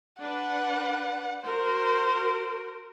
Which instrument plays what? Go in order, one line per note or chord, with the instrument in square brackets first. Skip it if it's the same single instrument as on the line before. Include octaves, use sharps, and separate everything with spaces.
[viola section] D4 B4 [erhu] F#5
[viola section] F#4 A#4 [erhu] C5